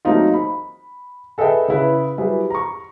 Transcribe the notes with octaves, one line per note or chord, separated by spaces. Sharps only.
F#3 A3 A#3 C4 D#4 F4
B5
G#4 A4 B4 D#5 E5 G5
C#3 E4 B4
F#3 G3 E4 G#4 B4 C5
A#5 C#6